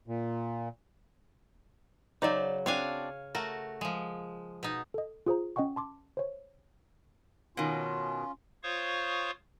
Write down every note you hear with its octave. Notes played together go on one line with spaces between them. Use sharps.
A#2
C#3 F#3 D#4 C5 D5
C4 D4 F#4 C#5 F5 G#5
A3 F#4 A#4
F3 G#3
B2 D#4
A4 D#5
F4 G#4 C5 A#5
C#4 D#5 F#5 G5 C#6
A5 C6 D6
C5 C#5
B2 D#3 C#4 F4
F4 C5 C#5 F5 C#6 D#6